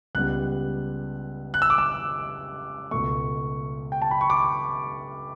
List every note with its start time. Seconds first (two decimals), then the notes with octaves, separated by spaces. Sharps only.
0.15 C#2 C#3 G3 B3 F#6
1.54 F#6
1.62 E6
1.70 D6
1.78 E6
2.91 C#2 B2 A3 C#6
3.92 G5
4.02 A5
4.11 B5
4.21 C#6
4.30 D6